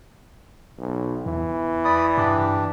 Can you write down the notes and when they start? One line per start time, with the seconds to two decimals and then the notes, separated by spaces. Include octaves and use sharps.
0.78 B1
1.26 E2 E3
1.85 D5 B5 D#6
2.17 G2 D4 G4